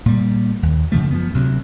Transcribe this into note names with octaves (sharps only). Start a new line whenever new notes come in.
A#2 G3
D#2
F#2 C#3 F3 A3
F3 B3
D2 C3 F#3